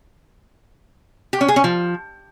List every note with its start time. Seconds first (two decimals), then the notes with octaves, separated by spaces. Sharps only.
1.33 G4
1.41 C#4
1.48 G#4
1.56 C#4
1.64 F3